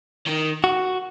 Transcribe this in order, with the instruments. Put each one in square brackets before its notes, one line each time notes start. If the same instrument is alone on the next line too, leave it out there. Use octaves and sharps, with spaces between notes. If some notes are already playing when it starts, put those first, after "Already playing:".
[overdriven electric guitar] D#3
[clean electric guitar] F#4